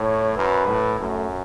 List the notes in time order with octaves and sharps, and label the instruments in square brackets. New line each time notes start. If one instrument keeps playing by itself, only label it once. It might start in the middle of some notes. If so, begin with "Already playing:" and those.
Already playing: [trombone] A2 [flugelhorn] C#5
[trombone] F#2 [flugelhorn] B4
[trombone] A2
[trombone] F#2 [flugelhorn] A3